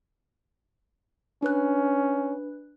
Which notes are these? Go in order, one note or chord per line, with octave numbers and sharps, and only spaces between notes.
C#4 D4 B4 F#6